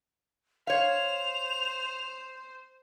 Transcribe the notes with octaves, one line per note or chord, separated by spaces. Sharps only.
C5 C#5 F5 F7